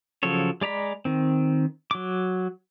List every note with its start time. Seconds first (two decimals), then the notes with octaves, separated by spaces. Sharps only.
0.23 C#3 F3 F#3 A4 C#5
0.61 G#3 D5 A#5 B5
1.05 D#3 C4
1.91 F#3 D6